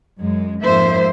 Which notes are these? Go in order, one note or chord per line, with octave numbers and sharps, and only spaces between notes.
F#2 G#3
F2 G#2 A#3 C5 E5